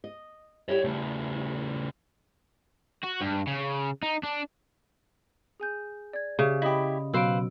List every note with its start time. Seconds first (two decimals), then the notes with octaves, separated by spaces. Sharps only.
0.04 D#5
0.69 G3 E4 G4 C#5 E5
0.84 C#3 A3
3.03 F#4
3.21 G2
3.47 C#3
4.03 D#4
4.23 D4
5.60 G#4 G#5 G6
6.13 D5 G#6
6.39 C#3 G4 E5 F5
6.62 E4 G4 D#5 B5 D#6
7.14 B2 F#3 B4 C5 F5 E6 D7